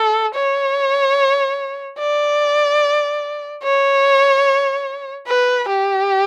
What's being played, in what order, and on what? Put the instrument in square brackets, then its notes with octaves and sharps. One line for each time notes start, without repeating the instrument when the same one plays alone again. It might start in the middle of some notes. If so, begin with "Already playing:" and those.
Already playing: [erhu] A4
C#5
D5
C#5
B4
G4